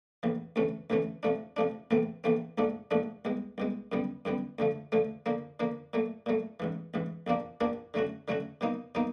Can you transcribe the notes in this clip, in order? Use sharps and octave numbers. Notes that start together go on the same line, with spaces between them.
A#1 A2 E3
D2 C3 E3 A3 C#4
D2 C3 E3 A3 C#4
C3 F3 A3 D4
C3 F3 A3 D4
A#1 A2 E3 A3 C4
A#1 A2 E3 A3 C4
A#1 G#2 F3 A3 D4
A#1 G#2 F3 A3 D4
C2 B2 G#3
C2 B2 G#3
F#2 D3 G3 B3
F#2 D3 G3 B3
D2 D3 F3 A3
D2 D3 F3 A3
D3 F3 A#3
D3 F3 A#3
A#2 F#3 A3
A#2 F#3 A3
A1 G#2 E3
A1 G#2 E3
A#1 A#2 F3 A#3 D4
A#1 A#2 F3 A#3 D4
D3 F#3 A3 C#4 F#4
D3 F#3 A3 C#4 F#4
B2 F#3 A#3 D#4
B2 F#3 A#3 D#4